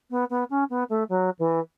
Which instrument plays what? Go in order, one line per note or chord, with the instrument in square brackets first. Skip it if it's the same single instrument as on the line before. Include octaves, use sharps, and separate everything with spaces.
[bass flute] B3
B3
C#4
B3
A3
F#3
E3